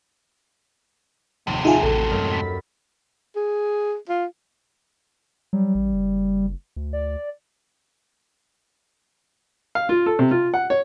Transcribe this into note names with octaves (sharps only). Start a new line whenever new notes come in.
F1 D#2 A2 C3 E7
D#4 F4 G#4 E5 G#5
A1 F#4 A4 C6
F#2 G#3 A#4
B5 A6 B6
G#4
F4
F#3 G3
A1
F#1
D2
D5
F5
F4
A4
C3
F4
F#5
C#5